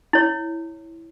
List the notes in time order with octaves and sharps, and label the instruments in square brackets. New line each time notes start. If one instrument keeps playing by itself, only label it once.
[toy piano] E4 C#5